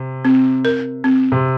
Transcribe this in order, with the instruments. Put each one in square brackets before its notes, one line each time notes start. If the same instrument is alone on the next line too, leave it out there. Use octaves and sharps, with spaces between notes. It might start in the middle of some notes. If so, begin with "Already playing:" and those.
Already playing: [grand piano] C3
[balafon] C4
A#4
C4
[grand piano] C3